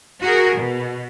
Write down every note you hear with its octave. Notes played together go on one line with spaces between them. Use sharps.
F#4 G#4 A#4
B2